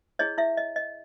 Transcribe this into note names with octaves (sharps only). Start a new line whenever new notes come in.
E4 G#4 C#5 D#5
E4 E5
D#5
D#5